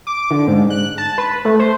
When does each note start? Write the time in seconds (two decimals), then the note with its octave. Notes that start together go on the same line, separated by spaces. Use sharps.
0.07 D6
0.31 D3
0.48 G#2
0.70 F#6
0.98 A5
1.18 B4
1.45 A3
1.59 C5